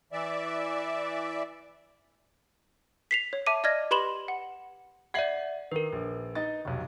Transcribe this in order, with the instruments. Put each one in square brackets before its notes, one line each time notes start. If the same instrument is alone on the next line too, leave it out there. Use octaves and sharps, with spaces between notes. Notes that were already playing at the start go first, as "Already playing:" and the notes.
[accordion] E3 D5 E5
[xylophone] B6 C7 F7
C#5
E5 A5 D6 D#7
D5 D#5 F6 G#6 A#6
G4 B4 B5 C6 E7 F#7
F#5
[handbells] D5 E5 F#5 [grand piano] G#6 C7 F#7
[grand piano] D#3 [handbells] A#4 B4
[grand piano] A#1
D#4 D#5 A6
F1 B1